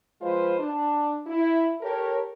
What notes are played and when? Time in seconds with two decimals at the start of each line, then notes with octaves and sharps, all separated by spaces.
0.21 F3 G#3 F4 B4 C5
0.59 D4
1.27 E4
1.81 G4 A4 A#4 C#5